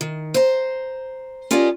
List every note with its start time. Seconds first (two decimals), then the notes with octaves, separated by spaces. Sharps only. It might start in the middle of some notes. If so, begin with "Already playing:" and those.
0.01 D#3
0.34 C5 A#5
1.51 C#4 F4 G4 A#4 D5 D#5